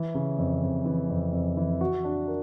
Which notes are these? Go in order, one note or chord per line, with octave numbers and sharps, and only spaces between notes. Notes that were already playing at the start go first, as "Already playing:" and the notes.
Already playing: E3
C#3
F2
F2
E3
F2
F2
E3
F#4
D4
A#4